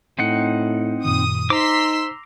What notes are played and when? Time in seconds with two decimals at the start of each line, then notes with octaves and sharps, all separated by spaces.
0.18 A2 C4 D#4 F#5
1.04 F#2 A#2 D#3 D#6
1.50 D#4 C5 A#5 C6 D6 E6 B6